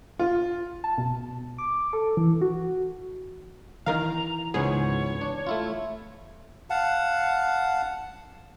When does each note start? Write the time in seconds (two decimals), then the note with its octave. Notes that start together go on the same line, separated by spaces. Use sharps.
0.19 F4
0.84 A5
0.98 B2
1.58 D6
1.93 A4
2.17 E3
2.41 F#4
3.86 D#3 E3 A#4 F5 A#5
4.54 C#2 G#2 B3 G#4 C#5
5.21 D4
5.47 A3 E4 F4
6.70 F5 F#5 A5